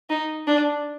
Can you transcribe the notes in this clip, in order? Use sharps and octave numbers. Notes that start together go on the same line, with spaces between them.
D#4
D4